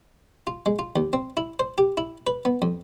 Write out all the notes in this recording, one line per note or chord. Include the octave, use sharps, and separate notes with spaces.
F4
G#3
F4
D#2
C4
E4
C5
G4
E4
B4
B3
F2